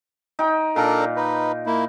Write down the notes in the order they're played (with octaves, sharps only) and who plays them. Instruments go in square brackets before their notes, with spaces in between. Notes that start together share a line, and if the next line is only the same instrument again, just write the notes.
[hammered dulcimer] D#4 G5
[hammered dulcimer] A#2 [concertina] D4 A4 A#4
[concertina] D#4 B4
A#3 E4